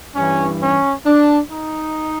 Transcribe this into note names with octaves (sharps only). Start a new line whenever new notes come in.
G2 E3 C#4
C#4
D4
D#4